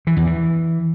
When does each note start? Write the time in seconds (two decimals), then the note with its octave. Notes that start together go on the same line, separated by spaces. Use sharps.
0.07 E3
0.17 E2
0.26 E3